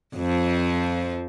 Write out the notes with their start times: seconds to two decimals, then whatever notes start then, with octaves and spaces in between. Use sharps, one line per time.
0.16 F2 F3